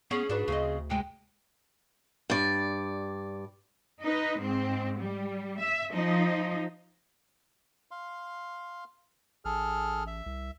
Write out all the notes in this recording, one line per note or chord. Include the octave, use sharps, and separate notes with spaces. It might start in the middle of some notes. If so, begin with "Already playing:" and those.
B3 C#4 G#4
G#2 D4 F#4 B4
D2 C#3 C4 D#5
C3 G#3 G5
G2 D5
D#4 B4
G#2 C4
G3
E5
F3 D#4
F5 C6
A1 G#4 A4 F6
E5
C2